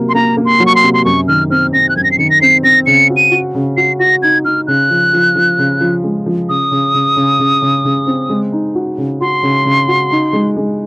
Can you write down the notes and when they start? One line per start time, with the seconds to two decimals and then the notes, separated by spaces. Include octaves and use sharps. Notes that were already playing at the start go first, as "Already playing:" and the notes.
Already playing: C3 F#3 A#3
0.09 C6
0.15 A#3 A#5
0.37 A#3
0.45 C6
0.59 F#3
0.66 C#6
0.75 C6
0.83 C3
0.94 C6
1.05 F#2 C#6
1.28 D#3 F6
1.50 C4 F6
1.73 C4 A#6
1.89 F#6
1.96 F#2 G#6
2.04 A#6
2.11 C7
2.19 D#3 C#7
2.30 A#6
2.41 C4 C7
2.63 C4 A#6
2.86 C#3 C#7
3.10 F#4
3.16 D#7
3.31 F#4
3.55 C#3
3.77 F#4 C7
3.99 F#4 A#6
4.22 D#4 G#6
4.44 D#4 F6
4.67 C#3 F#6
4.90 F3
5.13 F3
5.36 F3
5.59 C#3
5.81 F3
6.04 G#3
6.26 F3
6.49 C#3 D#6
6.71 C#3
6.94 C#3
7.16 C#3
7.39 C#3
7.62 C#3
7.85 C#3
8.07 C4
8.29 G#3
8.52 D#4
8.75 F#4
8.98 C#3
9.21 F#4 C6
9.43 C#3
9.65 C#3
9.88 F#4
10.11 D#4
10.33 G#3
10.57 G#3